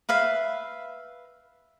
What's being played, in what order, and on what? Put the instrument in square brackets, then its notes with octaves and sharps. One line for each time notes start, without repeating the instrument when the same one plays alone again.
[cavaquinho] B4 E5 F5